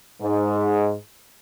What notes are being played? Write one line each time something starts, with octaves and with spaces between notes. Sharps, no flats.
G#2